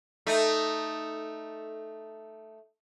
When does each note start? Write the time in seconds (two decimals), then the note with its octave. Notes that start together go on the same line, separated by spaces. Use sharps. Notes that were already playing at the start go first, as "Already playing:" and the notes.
0.27 A3 D#4